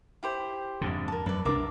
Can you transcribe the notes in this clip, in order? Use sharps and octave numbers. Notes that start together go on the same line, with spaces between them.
E4 G4 C5
F2 G#2 D3
A#4 A5
F#2 B4 D5
C2 D4 A#4 E5 D6